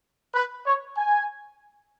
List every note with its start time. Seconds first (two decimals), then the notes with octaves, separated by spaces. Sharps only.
0.35 B4
0.67 C#5
0.97 G#5